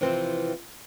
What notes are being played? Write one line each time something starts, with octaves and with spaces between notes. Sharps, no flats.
C3 E3 F3 C4